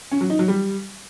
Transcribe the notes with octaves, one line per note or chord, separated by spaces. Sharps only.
C#4
F#3
D#4
F#3
G3